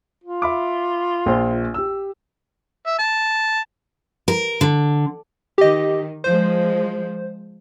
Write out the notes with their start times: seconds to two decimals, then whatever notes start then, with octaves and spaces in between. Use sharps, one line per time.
0.24 F4
0.42 E5 B5 D6
1.26 A#1 C5
1.74 G4 E6
2.87 E5
2.99 A5
4.28 A#4
4.61 D3
5.58 D#3 G4 D#5
6.24 F3 G#3 C5